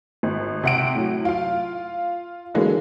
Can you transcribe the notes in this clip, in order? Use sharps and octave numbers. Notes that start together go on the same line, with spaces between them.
G#1
C3 F#5 D7
A2 F#3
F4 F5
D3 E3 F#3 G#3 A#3 B3